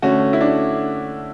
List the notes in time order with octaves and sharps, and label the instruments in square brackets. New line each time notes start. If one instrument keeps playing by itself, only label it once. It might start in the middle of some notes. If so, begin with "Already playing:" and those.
[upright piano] D3 A3 C#4 [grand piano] F#4
[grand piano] E4
D4